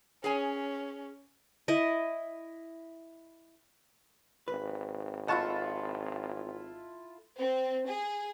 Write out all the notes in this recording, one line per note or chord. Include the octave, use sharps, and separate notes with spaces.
C#4 G#4 C#5 G#5
E4 D#5
G#1 B4
E4 F4 A4 D#5 F#5 A5 C#6
C4
G#4